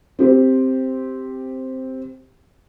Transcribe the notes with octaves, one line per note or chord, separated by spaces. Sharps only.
C4 G4 C5